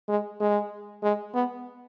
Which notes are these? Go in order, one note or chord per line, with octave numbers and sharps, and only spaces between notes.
G#3
G#3
G#3
B3